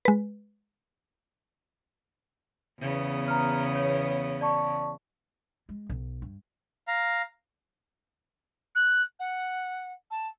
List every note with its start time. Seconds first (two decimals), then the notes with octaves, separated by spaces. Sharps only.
0.05 G#3 B4
2.79 E2 C#3 B3
3.28 A#5 F6
3.76 C#5
4.41 D5 A5 C#6
5.69 G#3
5.90 B1
6.22 G2
6.87 F5 A#5
8.75 F#6
9.19 F#5
10.11 A5